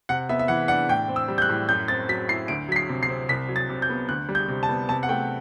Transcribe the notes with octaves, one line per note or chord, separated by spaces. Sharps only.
C3 F#5
B3 E5
E5
E3 F#5
D4 F#5
A2 G5
C4
E6
G3
G6
F#6
A2
F#2 G6
C4 A6
F#3 B6
E4 C7
D2 D7
F#3 B6
C7
C3
C7
C4
C2 B6
F#3
A6
C3
G6
B3
D2 F#6
G3
G6
C3
A5
B3
C3 A5
F#5
A3 G5